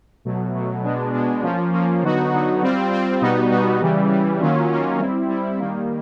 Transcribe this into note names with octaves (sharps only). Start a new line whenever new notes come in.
B2 F#3 A3
B2 F#3 A3
B2 G#3 B3 D4
B2 G#3 B3 D4
F3 A#3 C#4 F4
F3 A#3 C#4 F4
D3 F#3 B3 D#4 F#4
D3 F#3 B3 D#4 F#4
G3 C4 F4
G3 C4 F4
B2 G3 B3 D#4 F#4
B2 G3 B3 D#4 F#4
C#3 E3 G3
C#3 E3 G3
D#3 F#3 A#3 C#4 F4
D#3 F#3 A#3 C#4 F4
G3 C4 E4
G3 C4 E4
D#3 G3 A#3